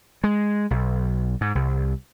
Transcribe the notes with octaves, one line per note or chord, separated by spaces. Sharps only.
G#3
B1
G#2
C2